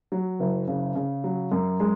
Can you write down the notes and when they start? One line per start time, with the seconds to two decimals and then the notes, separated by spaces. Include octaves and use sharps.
0.12 F#3
0.40 F#1
0.68 C#3
0.95 C#3
1.24 F#3
1.52 F#2
1.80 G#3